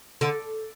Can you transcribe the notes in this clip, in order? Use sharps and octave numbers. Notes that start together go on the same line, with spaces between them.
D3